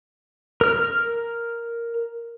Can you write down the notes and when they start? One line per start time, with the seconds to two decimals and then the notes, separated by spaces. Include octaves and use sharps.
0.61 A#4 F6